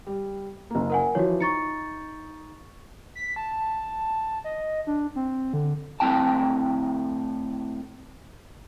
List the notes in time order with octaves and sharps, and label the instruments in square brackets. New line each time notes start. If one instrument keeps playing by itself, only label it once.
[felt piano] G3
F#1 A#3
[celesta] A#4 F#5 G#5
[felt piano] E3 F3 [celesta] F#4 C#5
[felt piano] D#4 [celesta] C#6 A6 C#7
[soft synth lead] B6
A5
D#5
D4
C4
D3
[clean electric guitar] A2 C4 C#4 E4 G5 A5